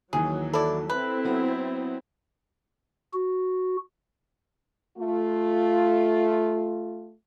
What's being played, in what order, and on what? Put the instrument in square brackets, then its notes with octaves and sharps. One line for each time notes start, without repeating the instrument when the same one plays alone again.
[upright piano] D#2 D#3 E3 [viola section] F#3 [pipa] G#4
[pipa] E4 D5 [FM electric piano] A4
[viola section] C4 E4 [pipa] B4
[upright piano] F#3 B3
[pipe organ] F#4
[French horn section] A3 F4